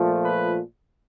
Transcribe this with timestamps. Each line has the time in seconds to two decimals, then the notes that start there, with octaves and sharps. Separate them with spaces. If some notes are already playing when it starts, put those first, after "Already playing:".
Already playing: A#2 F3 A3
0.23 B4